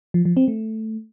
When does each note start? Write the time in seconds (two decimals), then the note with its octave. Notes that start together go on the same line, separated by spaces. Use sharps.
0.14 F3
0.25 F3
0.37 C4
0.48 A3